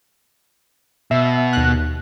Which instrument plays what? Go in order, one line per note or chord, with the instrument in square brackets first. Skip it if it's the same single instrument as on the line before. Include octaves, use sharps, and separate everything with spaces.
[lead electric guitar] B2 [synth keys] E5
[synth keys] D#2 F#6